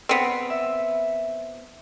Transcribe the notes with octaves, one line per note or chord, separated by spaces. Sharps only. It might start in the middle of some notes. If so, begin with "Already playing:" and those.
B3 C4
E5